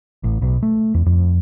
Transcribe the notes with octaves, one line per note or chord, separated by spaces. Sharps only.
A1
B1
A3
E2
F2